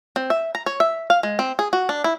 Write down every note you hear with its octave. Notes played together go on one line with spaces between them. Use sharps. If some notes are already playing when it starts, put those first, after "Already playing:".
C4
E5
A#5
C#5
E5
F5
G#3
C4
G#4
F#4
D4
E4